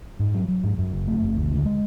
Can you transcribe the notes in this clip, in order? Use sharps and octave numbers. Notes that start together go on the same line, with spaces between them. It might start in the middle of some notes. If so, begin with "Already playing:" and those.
G#2
F#3
F#3
G#2
F#2
F#1
A3
F#1
D2
C#3
G#3